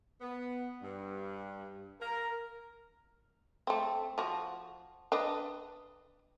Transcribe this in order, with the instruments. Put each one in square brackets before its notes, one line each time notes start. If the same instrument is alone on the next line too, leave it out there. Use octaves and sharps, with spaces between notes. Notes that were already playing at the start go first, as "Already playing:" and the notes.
[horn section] B3
G2
A#4
[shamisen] A3 C4
F3 F#4
D4 B4 D#5